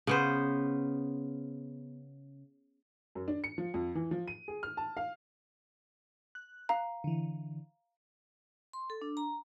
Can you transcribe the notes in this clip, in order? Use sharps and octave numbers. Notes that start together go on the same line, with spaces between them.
C#3 B3 C5
F#2
D4
C#7
F3
F2
E3
F3
D#7
G#4
F6
A5
F5
F#6
F5 A#5
D3 E3
C6
A4
D4
A#5